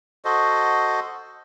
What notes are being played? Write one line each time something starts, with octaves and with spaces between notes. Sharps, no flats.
F#4 A4 C5 D#5